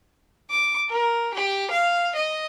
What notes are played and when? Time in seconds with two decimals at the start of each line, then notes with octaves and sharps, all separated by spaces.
0.49 D6
0.88 A#4
1.34 G4
1.71 F5
2.14 D#5